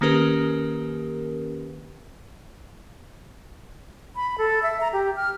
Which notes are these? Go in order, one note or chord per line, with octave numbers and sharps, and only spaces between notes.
D#3 A#3 C#4 G4 A#4 B4
B5
A4
E5
A#5
G4
F6